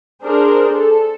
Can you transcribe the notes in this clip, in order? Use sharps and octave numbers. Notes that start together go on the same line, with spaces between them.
D4 G#4 A#4 C5
A4